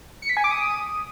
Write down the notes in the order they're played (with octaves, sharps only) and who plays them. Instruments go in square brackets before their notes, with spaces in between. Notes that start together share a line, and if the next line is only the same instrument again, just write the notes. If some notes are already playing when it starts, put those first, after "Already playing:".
[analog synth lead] C#7
B6
G#5
D6
D#6